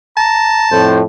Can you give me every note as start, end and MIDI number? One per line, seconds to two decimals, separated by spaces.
0.17 0.93 81
0.17 0.69 82
0.71 1.01 41
0.71 1.01 45
0.71 0.98 72